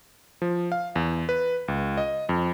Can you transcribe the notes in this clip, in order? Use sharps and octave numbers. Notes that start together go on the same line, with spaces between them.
F3
F5
E2
B4
C#2
D#5
F2